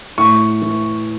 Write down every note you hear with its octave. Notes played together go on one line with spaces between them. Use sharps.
A2 C#6
E3